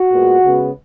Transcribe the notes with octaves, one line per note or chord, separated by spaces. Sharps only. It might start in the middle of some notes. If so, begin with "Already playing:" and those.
Already playing: F#4
A#2 G#3 B3
C#3 G#3 B3